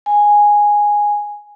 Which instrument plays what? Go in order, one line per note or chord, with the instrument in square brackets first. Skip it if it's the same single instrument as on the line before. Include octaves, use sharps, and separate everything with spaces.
[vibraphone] G#5